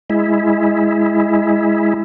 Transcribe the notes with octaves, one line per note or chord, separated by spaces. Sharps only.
G#3 E4